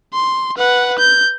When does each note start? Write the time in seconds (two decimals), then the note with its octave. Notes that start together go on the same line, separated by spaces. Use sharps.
0.14 C6
0.57 B4 F#5
0.99 G6